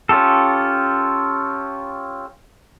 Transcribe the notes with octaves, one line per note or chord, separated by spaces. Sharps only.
C#4 F4 G4 A4